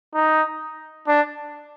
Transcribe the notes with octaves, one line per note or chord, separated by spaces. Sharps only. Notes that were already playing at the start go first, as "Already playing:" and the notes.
D#4
D4